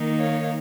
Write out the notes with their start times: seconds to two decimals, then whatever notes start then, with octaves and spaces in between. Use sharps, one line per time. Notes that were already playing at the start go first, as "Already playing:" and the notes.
Already playing: D#3 A#3 D#4
0.19 C#5 F5